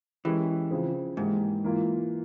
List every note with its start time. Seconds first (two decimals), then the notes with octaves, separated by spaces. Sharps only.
0.25 E3 G#3 C#4 G4 A#4
0.71 C#3 F3 C4 F4 G#4
1.17 G#2 E3 A#3 E4 G4 A#4
1.64 E3 A#3 F4